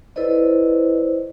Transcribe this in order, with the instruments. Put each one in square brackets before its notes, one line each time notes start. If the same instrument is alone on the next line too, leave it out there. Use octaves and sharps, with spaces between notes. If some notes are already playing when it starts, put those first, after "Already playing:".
[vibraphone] E4 A4 B4 C5 D5 D#5